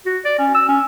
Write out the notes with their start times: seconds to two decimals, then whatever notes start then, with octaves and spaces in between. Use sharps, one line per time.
0.06 F#4
0.25 D5
0.39 C#4
0.54 E6
0.69 C#4